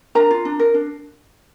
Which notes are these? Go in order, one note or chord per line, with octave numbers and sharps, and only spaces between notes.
D4 A#4 A#5
F4
D4
A#4
D4